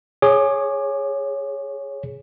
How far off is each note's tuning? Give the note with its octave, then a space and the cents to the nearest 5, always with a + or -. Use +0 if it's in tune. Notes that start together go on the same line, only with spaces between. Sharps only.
G#4 +0 C#5 +0 D6 +30